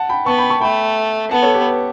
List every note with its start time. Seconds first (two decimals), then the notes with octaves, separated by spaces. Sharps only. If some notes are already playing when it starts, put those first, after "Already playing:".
Already playing: F#5 A5
0.09 G5 B5
0.26 B3 A5 C#6
0.38 G5 B5
0.50 A5 C#6
0.61 A3 G5 B5
1.31 B3 F#5 A5
1.42 A4 C#5
1.54 G4 B4